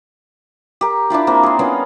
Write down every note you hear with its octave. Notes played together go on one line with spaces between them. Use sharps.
G4 A#4
D4 E4 F4 G4
A#3 C4
G#4 C6
B3 C#4 F4 A#4